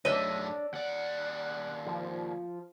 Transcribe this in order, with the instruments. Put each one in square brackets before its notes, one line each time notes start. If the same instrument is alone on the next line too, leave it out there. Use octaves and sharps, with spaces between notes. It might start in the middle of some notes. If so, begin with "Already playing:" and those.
[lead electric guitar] F#2 A3 [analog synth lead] D4 [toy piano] C#5 [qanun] D#5 E5
[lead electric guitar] D#2 D5 [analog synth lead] F#5
[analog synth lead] F3